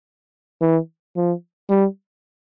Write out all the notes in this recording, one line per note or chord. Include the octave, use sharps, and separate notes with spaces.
E3
F3
G3